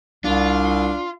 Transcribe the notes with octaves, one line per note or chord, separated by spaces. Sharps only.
C2 D4 F4